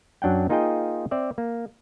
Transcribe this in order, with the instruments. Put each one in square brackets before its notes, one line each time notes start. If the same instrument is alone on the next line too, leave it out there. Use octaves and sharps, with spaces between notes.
[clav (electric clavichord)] F#2 F#3 D4 F#5 G5
A#3 D#4 F4 G#4 D#5 G5
C4 D5 E5
A#3